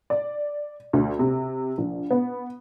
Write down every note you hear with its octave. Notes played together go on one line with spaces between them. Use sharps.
D5
D2
C3
A#1
B3